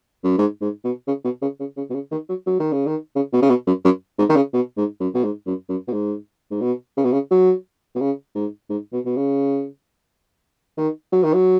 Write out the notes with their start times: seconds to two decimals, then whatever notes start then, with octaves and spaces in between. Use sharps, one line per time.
0.24 F#2
0.38 G#2
0.61 G#2
0.84 B2
1.07 C#3
1.24 B2
1.42 C#3
1.60 C#3
1.77 C#3
1.90 B2
1.94 C#3
2.11 D#3
2.29 F#3
2.46 F#3
2.60 D#3
2.72 C#3
2.86 D#3
3.16 C#3
3.33 B2
3.42 C#3
3.49 B2
3.67 F#2
3.84 F#2
4.19 G#2
4.29 D#3
4.36 C#3
4.53 B2
4.77 G#2
5.00 F#2
5.14 B2
5.24 G#2
5.46 F#2
5.69 F#2
5.88 B2
5.92 G#2
6.51 G#2
6.61 B2
6.97 C#3
7.04 B2
7.12 C#3
7.31 F#3
7.95 B2
8.00 C#3
8.35 G#2
8.69 G#2
8.92 B2
9.05 B2
9.16 C#3
10.77 D#3
11.12 F#3
11.23 D#3
11.33 F#3